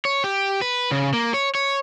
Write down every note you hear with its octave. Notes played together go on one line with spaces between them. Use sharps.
C#5
G4
B4
C#3
A#3
C#5
C#5